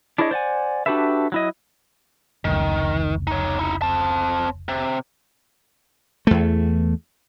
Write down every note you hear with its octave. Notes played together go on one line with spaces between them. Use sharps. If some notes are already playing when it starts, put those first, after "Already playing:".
D4 E4 G#4 A#4 C#5 D#5
C5 D5 F#5 G#5
D4 F#4 G4 A4 B4 E5
F#3 E4 D#5
F1 C#2 D#3
D#4 C#5
D#4 E4
C4 A5
C3
E2 A3